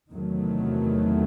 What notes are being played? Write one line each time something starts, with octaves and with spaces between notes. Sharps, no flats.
E2 C3 D#3 F#3 A3